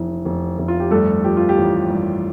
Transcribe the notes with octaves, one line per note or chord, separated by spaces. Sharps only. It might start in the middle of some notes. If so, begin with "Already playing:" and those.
Already playing: F1 E3
F1
F1
F4
G4
G2 A3 A4
F3 G4
F4
G4
A1
G2